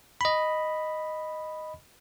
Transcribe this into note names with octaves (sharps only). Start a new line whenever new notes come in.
D#5 B5